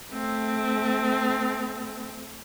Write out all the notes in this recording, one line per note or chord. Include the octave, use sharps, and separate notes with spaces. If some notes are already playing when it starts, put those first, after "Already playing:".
A3 C4